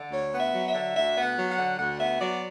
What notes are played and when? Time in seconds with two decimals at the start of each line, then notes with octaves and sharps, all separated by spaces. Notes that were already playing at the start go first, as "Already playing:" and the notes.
Already playing: D3
0.11 D2 C#5
0.33 B3
0.39 E5
0.53 F#3
0.67 E5
0.75 D3
0.95 D2 E5
1.16 B3
1.23 F#5
1.37 F#3
1.51 F#5
1.58 D3
1.78 D2 F#5
1.99 B3 E5
2.20 F#3 D5